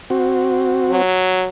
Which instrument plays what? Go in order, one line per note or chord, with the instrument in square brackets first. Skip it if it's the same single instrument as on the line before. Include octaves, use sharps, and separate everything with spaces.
[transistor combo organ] C4 F#4
[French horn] F#3